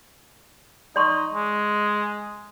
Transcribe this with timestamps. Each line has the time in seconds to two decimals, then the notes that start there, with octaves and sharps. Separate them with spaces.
0.96 D#4 D5 C6 C#6
1.33 G#3